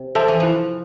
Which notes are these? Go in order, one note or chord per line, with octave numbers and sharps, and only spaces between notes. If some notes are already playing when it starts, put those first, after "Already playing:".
Already playing: C3
F3 A4 C5 E5 A5
E3
F3 E4